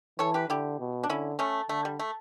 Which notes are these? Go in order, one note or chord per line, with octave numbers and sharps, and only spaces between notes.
E3 A4 C#5
G4 B4
D3 E4 G4
B2
D4
D3 C#4 E4
A3 C#4
D3 A3
G3
A3